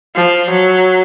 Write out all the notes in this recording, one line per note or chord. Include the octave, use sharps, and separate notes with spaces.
F3
F#3